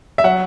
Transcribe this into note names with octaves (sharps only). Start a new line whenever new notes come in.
E5
F#3 F#5